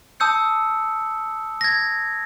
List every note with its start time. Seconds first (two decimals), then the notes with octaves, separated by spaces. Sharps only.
0.20 A5 D#6 E6 G6 C#7
1.61 G#6 A#6